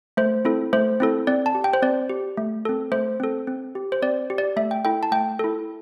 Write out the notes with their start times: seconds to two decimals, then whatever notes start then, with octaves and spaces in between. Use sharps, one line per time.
0.17 A3 C5
0.45 C4 E4 A4
0.73 A3 C5
1.00 C4 E4 A4
1.27 C4 D5
1.46 A5
1.55 G4
1.64 G5
1.73 C5
1.82 C4 D5
2.09 G4
2.37 A3
2.65 C4 A4
2.92 A3 C5
3.20 C4 A4
3.47 C4
3.75 G4
3.92 C5
4.02 C4 D5
4.30 G4
4.38 D5
4.56 A3 E5
4.71 G5
4.85 E4 A4 G5
5.03 A5
5.11 A3 G5
5.39 E4 A4